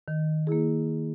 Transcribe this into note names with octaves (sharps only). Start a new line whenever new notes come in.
D#3
A#3 E4 G#4